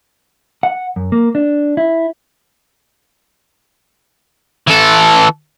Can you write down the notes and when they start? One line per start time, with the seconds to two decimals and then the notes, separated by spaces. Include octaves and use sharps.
0.63 F#5
0.96 F#2
1.12 A#3
1.35 D4
1.77 E4
4.68 E3 A4